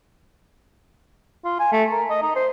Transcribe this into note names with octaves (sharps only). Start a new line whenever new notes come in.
F4
G#5
A3
A#4
D#5
D#4
C5